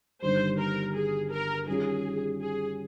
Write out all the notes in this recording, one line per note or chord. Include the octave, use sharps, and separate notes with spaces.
G1 G2 D#3 G3 C5
A#4
G#4
A#4
D#3 G3 C#4 F4 G#4
G#4